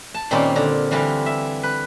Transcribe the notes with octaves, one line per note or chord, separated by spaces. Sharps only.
A5
A#2 D#3 G3 C4 C#4 F4
D3
D3 E3 G3 F4
E5
B4